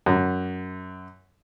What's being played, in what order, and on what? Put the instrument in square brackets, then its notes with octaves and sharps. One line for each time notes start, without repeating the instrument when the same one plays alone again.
[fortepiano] F#2